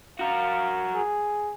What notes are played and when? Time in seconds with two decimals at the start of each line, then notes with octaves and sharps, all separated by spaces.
0.19 F#4 A#4 F5
0.95 G#4